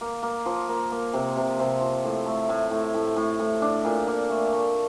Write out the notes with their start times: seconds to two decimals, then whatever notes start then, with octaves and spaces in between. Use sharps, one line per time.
0.01 A#3
0.23 A#3
0.46 F3
0.69 A#3
0.92 A#3
1.13 C3
1.37 C3
1.59 C3
1.81 F3
2.05 A2
2.26 A3
2.49 A2
2.71 A2
2.94 A2
3.16 A2
3.40 A2
3.62 D4
3.85 A#2
4.07 A#2
4.30 A3
4.53 A3